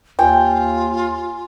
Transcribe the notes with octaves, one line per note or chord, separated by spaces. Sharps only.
D#2 F4 G5 G#5